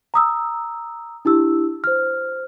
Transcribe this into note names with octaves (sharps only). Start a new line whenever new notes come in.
A#5 D#6 E6
D4 E4 G4 E6
C5 F6